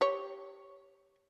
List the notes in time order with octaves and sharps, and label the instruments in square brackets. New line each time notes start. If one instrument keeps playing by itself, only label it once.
[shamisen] G4 C#5